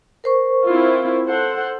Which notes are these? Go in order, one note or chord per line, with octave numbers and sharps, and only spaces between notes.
A#4 C5 C#6
C4 E4 F4
A4 C5 F#5